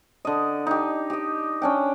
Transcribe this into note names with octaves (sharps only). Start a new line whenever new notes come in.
D3 D#5
D#4 G4
G4 D#5
C#4 D4 G5